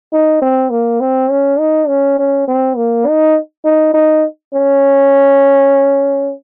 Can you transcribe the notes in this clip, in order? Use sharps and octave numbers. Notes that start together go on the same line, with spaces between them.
D#4
C4
A#3
C4
C#4
D#4
C#4
C#4
C4
A#3
D#4
D#4
D#4
C#4